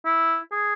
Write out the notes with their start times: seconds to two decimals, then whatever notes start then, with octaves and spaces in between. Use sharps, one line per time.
0.05 E4
0.52 G#4